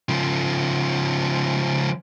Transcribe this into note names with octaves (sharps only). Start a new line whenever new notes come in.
C#3 F3